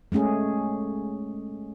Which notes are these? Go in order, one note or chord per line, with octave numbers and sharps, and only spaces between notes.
G#3 A3 C#4 G#4